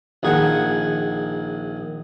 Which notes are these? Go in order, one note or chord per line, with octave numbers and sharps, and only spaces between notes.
A#1 D#3 G#4 F#5